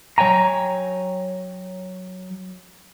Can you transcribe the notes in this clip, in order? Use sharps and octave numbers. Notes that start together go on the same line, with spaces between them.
F#3 C#5 G5 G#5 A#5